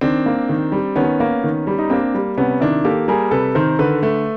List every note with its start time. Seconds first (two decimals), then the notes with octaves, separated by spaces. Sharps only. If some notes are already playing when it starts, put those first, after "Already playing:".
0.01 D#3 C4 D4
0.26 A#3
0.49 D#3
0.72 G3
0.96 D#3 B3 C#4
1.20 A#3
1.44 D#3
1.67 G3
1.79 D#4
1.90 A#3 C4 D4
2.14 G3
2.37 C3 B3 C#4
2.61 D#3 D4 E4
2.85 A#3 G4 A4
3.08 G3 G#4 A#4
3.31 C3 A4 B4
3.55 D#3 A#4 C5
3.79 D3 A4 B4
4.03 A3